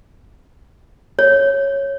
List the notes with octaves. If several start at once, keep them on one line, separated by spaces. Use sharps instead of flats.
C#5